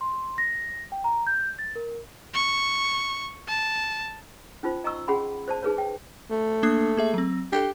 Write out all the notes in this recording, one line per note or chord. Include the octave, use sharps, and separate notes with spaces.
C6
A#6
G5
A#5
G6
A6
A#4
C#6
A5
C#4 D#4 F4 C5
D#5 A#5 C#6 E6
C#4 G#4 F#5 B5 C6
C5 D5 A5
D#4 G#4 B4 C#5
G5
A3
A#3 D4 D#6
A#3 G#4 E5
F#3 C4
D4 G4 A4